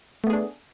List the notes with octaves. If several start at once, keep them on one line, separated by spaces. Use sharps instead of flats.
A3 B3 D4 G#4